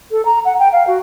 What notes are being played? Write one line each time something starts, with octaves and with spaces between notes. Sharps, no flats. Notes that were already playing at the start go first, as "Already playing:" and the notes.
A4
A#5
F#5
G5
F5
F#4